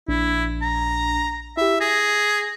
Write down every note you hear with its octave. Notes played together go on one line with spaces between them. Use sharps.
A#1 D4 E4
A#5
E4 G4 E5
G#4 A#6